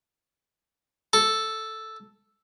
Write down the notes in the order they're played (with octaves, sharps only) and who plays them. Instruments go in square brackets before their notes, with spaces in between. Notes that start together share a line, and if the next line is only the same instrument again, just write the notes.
[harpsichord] A4